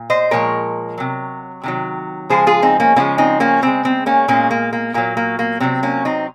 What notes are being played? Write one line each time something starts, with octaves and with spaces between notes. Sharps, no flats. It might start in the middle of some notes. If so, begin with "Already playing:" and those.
Already playing: A#2
C5 D#5
A#2 F3 G#3 A#4 C#5
C3 F#3
C3 D#3 F#3
C#3 F3 G#3 G#4 C5
F4 G#4
C4 D#4
A#3 C#4
C#3 F3 G#3 A#3 C#4
C4 D#4
A#3 C#4
C#3 G#3 C4
C4
A#3 C#4
A#2 G#3 A#3 C#4
A#3
A#3
A#2 F#3 A#3
A#3
A#3
C3 F#3 C4
A#3 C#4
C4 D#4